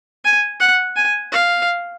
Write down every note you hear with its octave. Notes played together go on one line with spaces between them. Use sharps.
G#5
F#5
G#5
F5